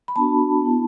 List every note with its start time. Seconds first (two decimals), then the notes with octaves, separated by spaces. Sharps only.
0.08 B5
0.16 B3 D4 F#4 A5
0.62 B3 E4